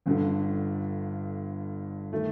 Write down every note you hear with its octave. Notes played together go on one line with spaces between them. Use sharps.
G1 G2 D3
D#3 A3